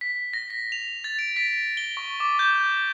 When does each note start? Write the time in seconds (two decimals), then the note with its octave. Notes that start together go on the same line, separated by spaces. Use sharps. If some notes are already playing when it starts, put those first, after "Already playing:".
0.01 B6
0.33 A#6
0.50 B6
0.72 F7
1.04 A6
1.19 D7
1.36 B6
1.77 G7
1.97 C#6
2.20 D6
2.39 G6